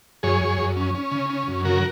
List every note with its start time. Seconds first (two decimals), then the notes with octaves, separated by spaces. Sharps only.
0.23 F#2 G#4 C#5
0.41 F#2
0.58 F#2
0.76 C#4
0.95 C#4
1.11 C#3
1.30 C#4
1.48 F#2
1.65 C#3 F#4 A#4